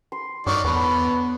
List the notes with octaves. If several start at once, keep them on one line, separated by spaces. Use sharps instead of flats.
C6
G2 D#3 F#4 C#5 D5
E2 D3 B3 B5